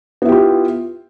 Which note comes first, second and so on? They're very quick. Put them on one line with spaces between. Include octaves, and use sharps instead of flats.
B3 E4 G4 F4